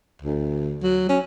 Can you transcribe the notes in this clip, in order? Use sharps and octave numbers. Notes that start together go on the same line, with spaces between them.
D2
F#3
C#4